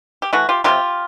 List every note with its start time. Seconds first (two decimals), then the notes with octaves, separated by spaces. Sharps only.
0.22 G4
0.33 E3 A3 E4 F#4
0.49 F4 G4
0.64 C3 D#3 F#3 F4 G4